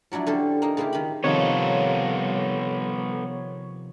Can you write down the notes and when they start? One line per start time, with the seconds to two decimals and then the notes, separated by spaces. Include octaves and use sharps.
0.12 F3 F#3 D4 E4
0.27 D3 C#4 G4 A4 C5
0.62 A#3 D#4
0.77 C#3 A#3 E4 F4 G4
0.93 D#3 B5
1.24 C3 D#3 F3 B3 A4 C#5